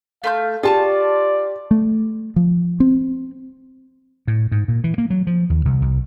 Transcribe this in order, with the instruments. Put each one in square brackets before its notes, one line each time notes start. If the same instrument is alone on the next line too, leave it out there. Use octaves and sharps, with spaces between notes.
[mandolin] A3 C6 G6 [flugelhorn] F5
[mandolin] F4 A5 C#6 [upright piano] G4 [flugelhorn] D5
[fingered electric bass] A3
F3
C4
[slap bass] A2
G#2
A#2
E3
A#3
F#3
F3
D#2
C2
C2